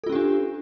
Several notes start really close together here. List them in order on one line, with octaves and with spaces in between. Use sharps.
A4 F4 C#4 G4 D4